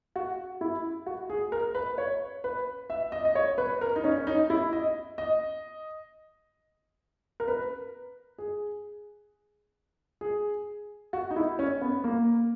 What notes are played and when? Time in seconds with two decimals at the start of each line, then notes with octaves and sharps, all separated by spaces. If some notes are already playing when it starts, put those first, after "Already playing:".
0.16 F#4
0.61 E4
1.06 F#4
1.30 G#4
1.52 A#4
1.75 B4
1.98 C#5
2.44 B4
2.90 E5
3.12 D#5
3.25 D#5
3.35 C#5
3.58 B4
3.81 A#4
3.96 D#4
4.04 C#4
4.18 C#4
4.27 D#4
4.50 E4
4.73 D#5
5.18 D#5
7.40 A#4
7.48 B4
8.38 G#4
10.21 G#4
11.13 F#4
11.31 D#4
11.36 E4
11.59 C#4
11.81 B3
12.04 A#3